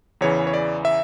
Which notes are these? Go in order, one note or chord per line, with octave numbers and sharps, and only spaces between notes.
E2 C#3 E3 C#5
C#5
D5
E5